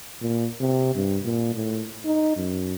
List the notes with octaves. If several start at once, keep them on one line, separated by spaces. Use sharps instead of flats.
A#2
C3
G2
A#2
A2
D#4
F#2